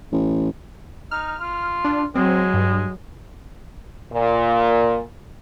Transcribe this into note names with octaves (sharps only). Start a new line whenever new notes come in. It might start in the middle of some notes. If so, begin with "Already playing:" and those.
A1
D#4 F6
F4
D4
F#3 G#3 C4
G2
A#2